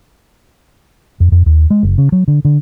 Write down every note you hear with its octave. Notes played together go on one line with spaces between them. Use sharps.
F2
F2
D#2
G#3
F#1
C#3
F#3
D3
D3